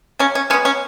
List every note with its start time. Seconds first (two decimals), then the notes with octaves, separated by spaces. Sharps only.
0.19 C#3 C#4
0.35 C#4
0.50 G#3 C#4
0.53 B3
0.65 C#4